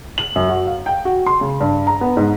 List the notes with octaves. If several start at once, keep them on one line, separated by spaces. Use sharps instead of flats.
F#7
F#2
F#4
F5
G5
F#4
C6
C#3
G2
A#5
B3
G#2